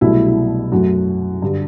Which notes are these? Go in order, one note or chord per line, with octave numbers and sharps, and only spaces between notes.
C2 B2 F#3 A3 E4
E4
F#2 F#3 A3 F#4
G2 D3 G3